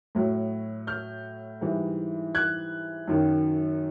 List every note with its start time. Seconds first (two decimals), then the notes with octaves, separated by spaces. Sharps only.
0.15 A2 F#3
0.87 F6 G6
1.61 G#2 E3 G3
2.35 F#6 G#6
3.07 F#2 D#3 F#3